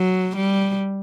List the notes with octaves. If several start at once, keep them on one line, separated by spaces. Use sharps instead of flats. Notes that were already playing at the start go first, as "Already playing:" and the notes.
Already playing: F#3
G3